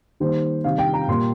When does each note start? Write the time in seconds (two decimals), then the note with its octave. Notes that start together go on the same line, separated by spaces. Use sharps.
0.20 D#3 G3 A#3 C5
0.64 C3 D#3 G3 F5
0.78 G5
0.94 A#5
1.08 A#2 G3 A#3 C6